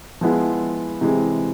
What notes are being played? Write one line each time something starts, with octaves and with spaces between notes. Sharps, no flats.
F3 G#3 B3 E4
C3 E3 G#3 C4